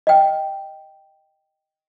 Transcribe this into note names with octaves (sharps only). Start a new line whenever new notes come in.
D#5 G5